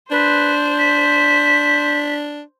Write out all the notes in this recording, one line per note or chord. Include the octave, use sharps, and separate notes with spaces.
D4 B4 C5
B6